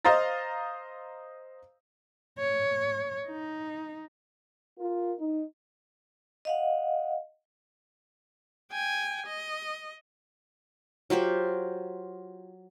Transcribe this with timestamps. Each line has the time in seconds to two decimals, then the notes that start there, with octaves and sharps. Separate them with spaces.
0.05 C5 D#5 F5 A#5 A6
2.38 C#5
3.27 D#4
4.79 F4 A#4
5.19 D#4
6.45 D#5 F5 F#5
8.72 G5 G#5
9.26 D#5
11.10 F#3 F4 G4 C5